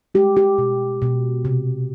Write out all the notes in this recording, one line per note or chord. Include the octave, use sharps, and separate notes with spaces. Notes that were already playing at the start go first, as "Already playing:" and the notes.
G#3 G4
G4
B2
B2
C3